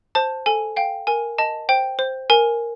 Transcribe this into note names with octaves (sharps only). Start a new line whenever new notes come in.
C5 A5
A4 G#5
F5 G5
A#4 G#5
D#5 A5
C5 G5
C5
A#4 G#5